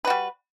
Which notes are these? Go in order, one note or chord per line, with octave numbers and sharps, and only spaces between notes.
G3 F#4 B4